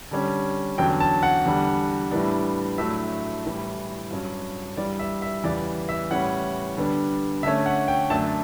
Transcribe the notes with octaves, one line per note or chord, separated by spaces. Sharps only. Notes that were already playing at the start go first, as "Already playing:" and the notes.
D3 G3 C#4
E2 D3 F#3 C#4 G5
A5
F#5
E2 D3 G3
A2 E3 G3 B3 D4
A2 F#3 A3 D4 E5
A2 E3 G3
G2 F#3 C#4
G2 E3 G3 D5
E5
E5
E2 C#3 E3 G3 B3 D5
E5
A2 E3 G3 C#4 F#5
D3 G3 B3 D4
D3 A3 C#4 E5
F#5
G5
F#2 D3 A3 D4 A5